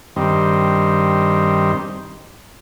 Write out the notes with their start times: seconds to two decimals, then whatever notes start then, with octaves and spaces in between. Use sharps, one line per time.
0.16 G2 D#3 C4